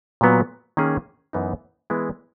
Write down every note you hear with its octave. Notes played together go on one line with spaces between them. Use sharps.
A#2 F#3 B3
D#3 A#3 C#4 G#4
F#2 E3 B3 D#4
E3 G#3 B3 E4